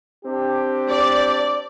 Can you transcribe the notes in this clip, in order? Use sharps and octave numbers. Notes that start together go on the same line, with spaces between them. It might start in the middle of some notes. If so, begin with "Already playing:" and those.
C4 D4 G4
D5